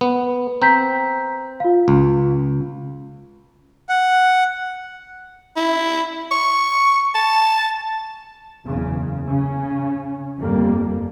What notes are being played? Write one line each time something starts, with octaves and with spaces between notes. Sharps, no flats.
B3
C4 A#5 G6 B6
F4 F5
C#2
F#5
E4
C#6
A5
F#1 E2 C#3
C#3 C#4
G1 F2 G3 A#3